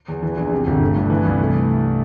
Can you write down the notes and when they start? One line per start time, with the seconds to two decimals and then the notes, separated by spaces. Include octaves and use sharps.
0.08 E2
0.23 E3
0.37 A#1
0.52 C3
0.67 G1
0.81 A3
0.96 G2
1.10 E3
1.25 C2
1.40 A3